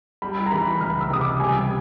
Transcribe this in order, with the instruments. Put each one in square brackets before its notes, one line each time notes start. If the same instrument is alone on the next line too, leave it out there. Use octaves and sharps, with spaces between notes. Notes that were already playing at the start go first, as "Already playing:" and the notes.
[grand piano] G3 [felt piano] B5
[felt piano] A#5
[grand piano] E3 [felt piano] B5
[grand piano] C#2 [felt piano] F6
[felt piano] E6
[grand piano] C3 [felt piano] D#6
[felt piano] D6
[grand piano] G3 [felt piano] G#5